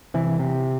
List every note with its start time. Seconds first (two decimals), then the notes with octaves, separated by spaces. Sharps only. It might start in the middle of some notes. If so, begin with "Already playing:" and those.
0.14 C3 E3
0.39 C3